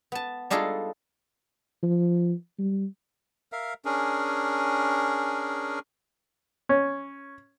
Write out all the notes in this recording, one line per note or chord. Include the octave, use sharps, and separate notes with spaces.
B3 A5
G3 D4 D#4 F4 G#4 A4
F3
G3
A#4 E5 F5
C#4 D4 G#4 A#4
C#4